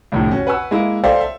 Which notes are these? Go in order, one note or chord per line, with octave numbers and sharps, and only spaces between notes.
C2 F2 A2 D3
C#4 F#4
B4 F#5 G#5 C#6 E6
G#3 A#3 E4
A4 C5 D5 E5 F5 G5
E5